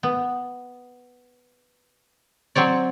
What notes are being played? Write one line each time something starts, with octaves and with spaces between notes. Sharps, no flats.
B3
F#3 C4 C#5 D5